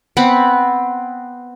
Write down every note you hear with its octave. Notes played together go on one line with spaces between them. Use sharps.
B3 C4 F#5 B5